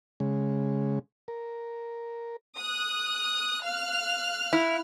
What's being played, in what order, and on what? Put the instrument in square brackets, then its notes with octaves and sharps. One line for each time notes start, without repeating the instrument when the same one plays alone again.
[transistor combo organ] C#3 G#3
A#4
[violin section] D#6 F#6
F5 F6 F#6
[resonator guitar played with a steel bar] E4